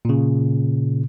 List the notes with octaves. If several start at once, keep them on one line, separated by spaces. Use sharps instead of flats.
A#2 C#3